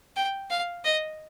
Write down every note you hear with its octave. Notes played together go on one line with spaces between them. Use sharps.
G5
F5
D#5